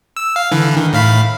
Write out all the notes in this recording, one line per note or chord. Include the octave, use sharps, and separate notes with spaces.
E6
F5
D3 E3
D#3
A2 F5 B5